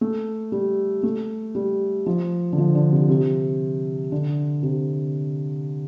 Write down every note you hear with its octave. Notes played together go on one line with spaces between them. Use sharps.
A3
G3
A3
G3
F3
D3
F3
D3
C3
C3
D3
C3